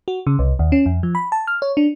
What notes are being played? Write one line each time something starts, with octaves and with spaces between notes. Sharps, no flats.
F#4
C#3
C2
D#2
C#4
F2
F3
B5
A5
F6
C#5
D4